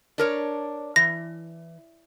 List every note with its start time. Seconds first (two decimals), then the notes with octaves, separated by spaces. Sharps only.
0.18 D4 A#4 C#5
0.96 E3 A#6